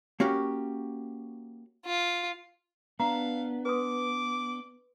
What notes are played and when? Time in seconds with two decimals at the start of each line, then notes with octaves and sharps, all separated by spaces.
0.20 A#3 C#4 F#4 G4
1.85 F4
3.00 B3 D4 F5 A#5
3.65 B4 C6 D6 D#6